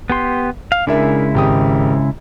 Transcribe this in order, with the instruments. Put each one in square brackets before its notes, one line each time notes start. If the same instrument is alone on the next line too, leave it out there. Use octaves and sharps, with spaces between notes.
[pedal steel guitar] B3 G4 C6
F5
[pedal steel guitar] C#3 G#3 E4 [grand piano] D4 A#4 E5
[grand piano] G#1 G4 D#6